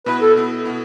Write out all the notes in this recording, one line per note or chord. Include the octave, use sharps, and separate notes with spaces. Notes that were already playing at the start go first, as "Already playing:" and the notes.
B2 B3 E4 B4
A4
B2 B3 E4
B2 B3 E4